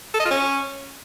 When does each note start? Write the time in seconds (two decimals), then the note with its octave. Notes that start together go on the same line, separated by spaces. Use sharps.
0.14 A4
0.20 D#5
0.25 F4
0.31 C#4